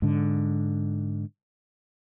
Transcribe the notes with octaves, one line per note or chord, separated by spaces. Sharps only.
G#2 D3